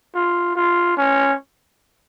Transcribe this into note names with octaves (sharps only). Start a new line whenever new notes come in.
F4
F4
C#4